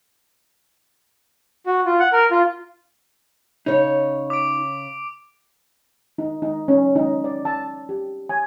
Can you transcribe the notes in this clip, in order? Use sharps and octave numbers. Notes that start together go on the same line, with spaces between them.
F#4
F4
F#5
A#4
F4
C#3 D#4 C#5
D6 D7
D#4
D#4
C#4
D#4
D5
A5
G4
G#5